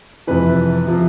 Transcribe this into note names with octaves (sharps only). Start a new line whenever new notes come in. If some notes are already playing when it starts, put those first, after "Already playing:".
F2 C3 E3 B4
C3 F3